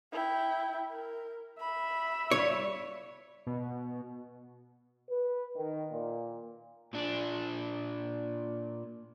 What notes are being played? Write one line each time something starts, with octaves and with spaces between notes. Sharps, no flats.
E4 G5
A#4
E5 B5
G3 D4 F4 C#5
B2
B4
D#3
A#2
A#2 D4